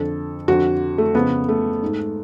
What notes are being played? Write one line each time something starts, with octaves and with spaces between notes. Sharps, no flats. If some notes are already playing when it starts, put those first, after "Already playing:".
Already playing: F2 D3 A4
F2 D3 F#4
A3
F2 C#3 B3
A3
G#2